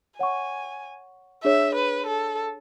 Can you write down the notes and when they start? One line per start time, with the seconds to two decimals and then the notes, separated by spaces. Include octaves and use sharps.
0.19 C#5 F#5 G#5 C#6
1.44 D4 G#4 C#5 E5
1.75 B4
2.07 A4